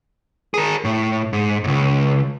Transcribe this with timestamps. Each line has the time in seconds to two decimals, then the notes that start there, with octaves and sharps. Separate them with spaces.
0.54 G#4 A#4
0.85 A2
1.33 G#2
1.64 C#2 G#2